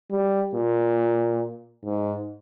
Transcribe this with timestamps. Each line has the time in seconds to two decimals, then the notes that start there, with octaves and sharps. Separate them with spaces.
0.11 G3
0.54 A#2
1.84 G#2